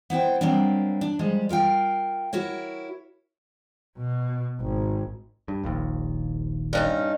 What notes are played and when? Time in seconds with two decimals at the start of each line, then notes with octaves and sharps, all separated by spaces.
0.10 B3 E4 C5 G5
0.41 F#3 G3 A#3 C4 D4
1.01 D4
1.19 F3 G3 G#3
1.49 F4 A#4 F5 G5
2.33 E4 F#4 A#4 C#5
3.98 B2
4.61 G#1
5.48 G2
5.63 D#1 A#1 D#2
6.73 G2 C#4 D#4